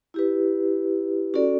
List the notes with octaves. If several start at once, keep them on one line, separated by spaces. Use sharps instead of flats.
E4 G4 B4
C#4 F#4 A4 D5